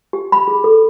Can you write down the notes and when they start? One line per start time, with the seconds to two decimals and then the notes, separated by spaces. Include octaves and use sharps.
0.13 G4
0.32 B5
0.48 G#4
0.64 A4